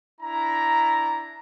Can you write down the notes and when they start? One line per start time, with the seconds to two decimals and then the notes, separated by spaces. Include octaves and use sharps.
0.21 D4 E4 A#5